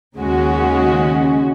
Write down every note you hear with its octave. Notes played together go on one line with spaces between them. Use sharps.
D#2 C#3 G#3 C#4 F#4